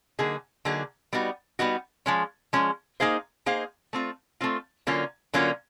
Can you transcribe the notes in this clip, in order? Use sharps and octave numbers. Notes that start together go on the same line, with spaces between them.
D3 F#3 A#3 D#4 G#4
D3 F#3 A#3 D#4 G#4
G3 B3 D#4 F#4
G3 B3 D#4 F#4
F3 G#3 C#4
F3 G#3 C#4
A#3 D#4 G#4 C5 F5
A#3 D#4 G#4 C5 F5
A3 C4 F4
A3 C4 F4
D3 F#3 A#3 C#4 F4
D3 F#3 A#3 C#4 F4